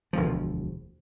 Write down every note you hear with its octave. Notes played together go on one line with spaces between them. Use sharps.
E1 D2 F3